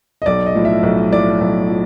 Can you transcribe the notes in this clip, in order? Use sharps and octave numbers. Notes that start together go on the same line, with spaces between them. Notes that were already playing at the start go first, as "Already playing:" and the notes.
D#5
B1 D5
D#5
A2 F3
E5
B1
A2 F3 D5
B1
F3